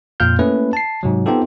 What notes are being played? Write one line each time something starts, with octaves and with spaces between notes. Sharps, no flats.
F2 A#2 F4 F5 F6 G6
A3 A#3 C#4 E4 B4
A5 C7
G#2 C3 F#3
B3 C4 D#4 F4 G4 A4